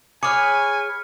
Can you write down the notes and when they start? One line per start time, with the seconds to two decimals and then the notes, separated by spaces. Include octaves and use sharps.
0.23 G#4 B4 C#5 G#5 D6 F6 C#7